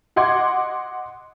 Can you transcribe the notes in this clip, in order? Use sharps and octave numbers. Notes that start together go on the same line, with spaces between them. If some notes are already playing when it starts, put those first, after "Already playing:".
D#5 F#5 C6 D6 G#6